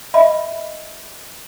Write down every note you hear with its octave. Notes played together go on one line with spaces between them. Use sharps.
D#5 E5 B5